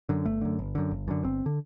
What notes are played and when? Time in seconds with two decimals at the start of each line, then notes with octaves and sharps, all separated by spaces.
0.09 F#2 D3
0.25 G1 A3
0.41 F#2 D3
0.59 G1
0.75 F#2 D3
0.91 G1
1.08 F#2 D3
1.24 G1 C4
1.46 D3